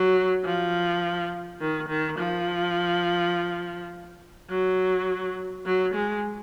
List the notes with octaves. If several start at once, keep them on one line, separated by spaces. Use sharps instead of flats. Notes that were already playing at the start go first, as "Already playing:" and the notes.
Already playing: F#3
F3
D#3
D#3
F3
F#3
F#3
G#3